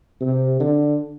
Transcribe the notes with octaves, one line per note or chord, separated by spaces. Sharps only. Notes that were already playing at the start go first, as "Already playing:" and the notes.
C3
D3